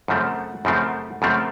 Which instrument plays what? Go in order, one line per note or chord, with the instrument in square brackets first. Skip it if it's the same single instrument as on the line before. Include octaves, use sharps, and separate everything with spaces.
[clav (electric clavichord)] F#2 C#3 F3 A3 C4 [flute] F#5
[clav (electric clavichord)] F#2 C#3 F3 A3 C4
[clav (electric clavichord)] F#2 C#3 F3 A3 C4 [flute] F#5